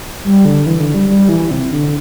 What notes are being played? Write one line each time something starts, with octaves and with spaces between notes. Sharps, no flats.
G3
D3
E3
D3
G3
G3
E3
C3
C3
D3